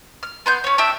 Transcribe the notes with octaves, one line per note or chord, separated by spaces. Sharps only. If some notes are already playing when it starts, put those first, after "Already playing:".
F6
B3 C6 G6
C#4 C#5
D4 G4 E5